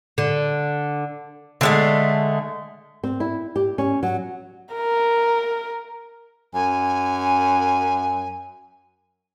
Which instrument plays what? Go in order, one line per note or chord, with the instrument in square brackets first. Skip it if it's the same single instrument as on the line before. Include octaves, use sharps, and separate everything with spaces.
[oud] D3
[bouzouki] D3 G#3 A3
[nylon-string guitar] C4
E4
G4
C#4
F#3
[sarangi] A#4
[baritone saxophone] F#2 [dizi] G#5